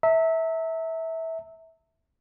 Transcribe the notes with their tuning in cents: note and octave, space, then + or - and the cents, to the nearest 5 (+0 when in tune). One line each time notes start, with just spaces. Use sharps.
E5 -20 A#5 -45